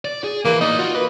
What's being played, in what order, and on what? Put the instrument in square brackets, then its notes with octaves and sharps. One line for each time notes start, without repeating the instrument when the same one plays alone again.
[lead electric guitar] D5
G#4
[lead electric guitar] E3 [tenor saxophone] A#3
[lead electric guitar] A#3 D5 [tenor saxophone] D#4
[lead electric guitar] F4 [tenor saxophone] F#4
[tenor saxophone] A#3 [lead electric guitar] B4